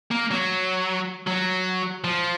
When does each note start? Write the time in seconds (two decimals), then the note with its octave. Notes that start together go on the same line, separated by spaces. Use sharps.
0.11 A#3
0.31 F#3
1.27 F#3
2.04 F3